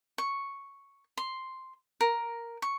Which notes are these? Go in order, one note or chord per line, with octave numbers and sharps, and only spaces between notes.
C#6
C6
A#4
C#6